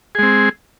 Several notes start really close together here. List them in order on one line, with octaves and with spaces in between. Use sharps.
G#4 G#3 C4